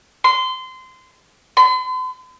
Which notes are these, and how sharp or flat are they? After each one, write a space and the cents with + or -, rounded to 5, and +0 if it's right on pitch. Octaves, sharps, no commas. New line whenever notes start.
C6 -20
C6 -45